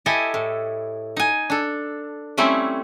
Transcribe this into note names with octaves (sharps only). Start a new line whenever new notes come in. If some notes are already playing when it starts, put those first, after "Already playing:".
E4 G4 A4 D#5 G#5 A5
A2
D#4 G#5
D4 A4
G3 A3 C4 C#4 E4